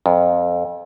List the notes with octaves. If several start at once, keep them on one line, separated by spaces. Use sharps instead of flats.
F2